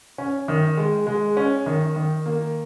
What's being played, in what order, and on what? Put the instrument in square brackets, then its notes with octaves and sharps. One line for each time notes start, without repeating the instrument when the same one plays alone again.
[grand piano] C#4
D#3
G#3
G#3
C#4
D#3
D#3
A#3